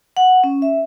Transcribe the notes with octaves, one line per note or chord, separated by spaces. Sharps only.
F#5
C#4
E5